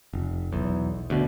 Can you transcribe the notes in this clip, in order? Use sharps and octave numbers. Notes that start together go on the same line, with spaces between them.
F1
B1 E2
D2 B2